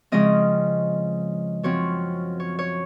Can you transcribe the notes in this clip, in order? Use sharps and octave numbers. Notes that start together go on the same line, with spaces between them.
C#3 F3 G#3 C4 D#5
F#2 F3 C4 C#5
C#5
C#5